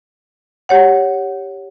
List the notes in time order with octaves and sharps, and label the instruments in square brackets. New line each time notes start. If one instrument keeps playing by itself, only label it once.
[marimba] G4 C#5 F#5